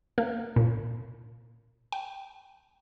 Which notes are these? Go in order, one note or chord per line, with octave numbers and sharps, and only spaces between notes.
A#3
A#2
G5